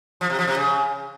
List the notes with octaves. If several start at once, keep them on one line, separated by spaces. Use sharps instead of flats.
F3
C3
F3
C3
C#3